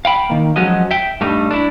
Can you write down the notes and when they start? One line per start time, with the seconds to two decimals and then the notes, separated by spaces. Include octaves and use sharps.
0.05 F5 G5 B5
0.30 D#3 A#3
0.56 F3 F#3 G#3 C#4 F#4 D#5
0.91 E5 G5
1.21 G2 G3 A3 D#4
1.51 D4 E4